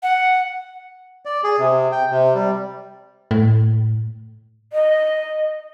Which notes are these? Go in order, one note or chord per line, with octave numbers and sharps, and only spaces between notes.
F#5
D5
G#4
C3
G5
C3
G3
A2
D#5